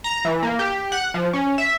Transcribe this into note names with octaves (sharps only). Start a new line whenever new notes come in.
A#5
E3
A#3
G4
F#5
F3
C#4
E5